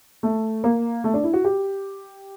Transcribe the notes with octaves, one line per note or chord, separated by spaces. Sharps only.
A3
A#3
A3
D4
E4
F#4
G4